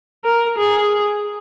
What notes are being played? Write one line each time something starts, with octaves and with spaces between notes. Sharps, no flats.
A#4
G#4